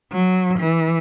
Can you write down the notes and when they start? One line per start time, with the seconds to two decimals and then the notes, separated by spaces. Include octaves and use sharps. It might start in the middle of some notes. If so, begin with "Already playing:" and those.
0.12 F#3
0.59 E3